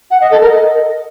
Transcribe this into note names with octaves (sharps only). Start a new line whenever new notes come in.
F#5
D#5
A4
A#4
D#5